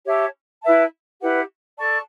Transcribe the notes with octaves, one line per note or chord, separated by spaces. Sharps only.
G4 C#5 E5 A5
E4 B4 E5 A5
E4 G4 B4 F#5
A4 D5 A5 C#6